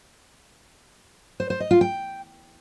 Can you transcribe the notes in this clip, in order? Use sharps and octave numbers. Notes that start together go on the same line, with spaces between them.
C5
C5
D#5
F4
G5